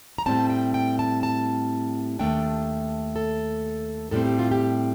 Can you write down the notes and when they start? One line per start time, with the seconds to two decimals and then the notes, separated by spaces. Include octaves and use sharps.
0.18 A#5
0.26 A2 G3 C4 A5
0.50 G5
0.74 G5
0.99 A5
1.23 A5
2.19 D#2 D3 A3 D4 G5
3.16 A4
4.11 A2 G3 C4 A4
4.25 G4
4.39 F4
4.51 G4